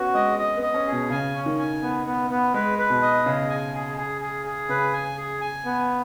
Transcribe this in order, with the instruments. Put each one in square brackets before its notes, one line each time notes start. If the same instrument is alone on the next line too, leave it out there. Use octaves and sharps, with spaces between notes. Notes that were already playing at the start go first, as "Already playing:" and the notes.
Already playing: [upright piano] B3 C#4 [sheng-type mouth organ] F#4
[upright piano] G#3 [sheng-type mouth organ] D#5
[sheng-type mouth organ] D#5
[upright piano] B3
[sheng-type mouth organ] D#5
[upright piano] C#4
[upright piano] B2 [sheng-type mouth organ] G#4
[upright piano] C#3 [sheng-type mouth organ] G#5
[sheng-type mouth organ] C#4
[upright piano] D#3
[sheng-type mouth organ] G#5
B3
B3
B3
[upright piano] G#3 [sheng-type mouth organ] B4
[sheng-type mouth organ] B4
[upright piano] B2
[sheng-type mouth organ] D#5
[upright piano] C#3 [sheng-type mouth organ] G#4
[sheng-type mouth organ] G#5
G#4
G#4
G#4
G#4
[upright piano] C#3 [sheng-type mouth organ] B4
[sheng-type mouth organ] G#5
G#4
G#5
B3